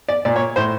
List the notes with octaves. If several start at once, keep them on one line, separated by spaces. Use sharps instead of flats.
D5
A#2 D5
C#5
A2 C5